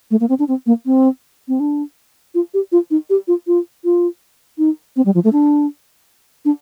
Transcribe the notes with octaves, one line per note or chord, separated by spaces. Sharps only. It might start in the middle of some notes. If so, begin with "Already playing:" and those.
A3
A#3
C4
D4
C4
A#3
C4
C4
D4
F4
G4
F4
D#4
G4
F4
F4
F4
D#4
C4
G3
F3
A3
D4
D4